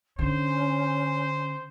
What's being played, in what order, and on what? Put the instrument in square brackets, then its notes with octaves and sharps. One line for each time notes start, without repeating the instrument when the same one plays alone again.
[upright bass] D3 [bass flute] C#4 [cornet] C5